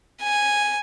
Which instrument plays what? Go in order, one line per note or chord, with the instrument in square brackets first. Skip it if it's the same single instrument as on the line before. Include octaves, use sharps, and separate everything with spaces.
[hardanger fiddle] G#5